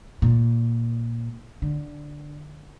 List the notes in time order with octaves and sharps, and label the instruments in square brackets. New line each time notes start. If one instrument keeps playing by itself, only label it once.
[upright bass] A#2
D3